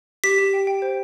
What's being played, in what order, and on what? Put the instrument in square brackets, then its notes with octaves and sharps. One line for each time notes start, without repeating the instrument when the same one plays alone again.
[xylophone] G4 B6
G4
G5
G5
C5